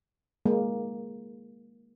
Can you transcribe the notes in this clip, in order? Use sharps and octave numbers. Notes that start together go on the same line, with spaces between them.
G#3 A#3